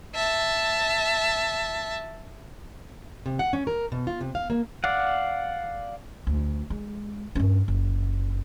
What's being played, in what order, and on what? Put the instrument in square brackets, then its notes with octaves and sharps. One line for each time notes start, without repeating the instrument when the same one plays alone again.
[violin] E5 A5
[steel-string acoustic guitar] C3
F#5
C#4
A#4
B2
F4
C3
F5
A#3
[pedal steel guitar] D5 F5 F#5
[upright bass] D2
G#3
G2 C#4
F#1